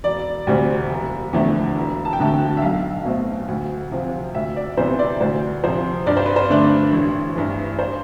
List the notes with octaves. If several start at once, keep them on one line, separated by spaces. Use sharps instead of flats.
E1 D5
D2 C3 G3 C4
E1
E2 D3 F3 A3
E1
A5
G5
D2 D3 A3 A5
G5
E5
B1 F5
B2 A3 C4
D2
C3 F3 C4 F4
D2 E5
D5
C3 E3 G3 B3 C5
D5
D2 C5
C3 F3 C5
G2 D5
C5
B4
C5
D3 A3 D4
A1
G2 E3
C5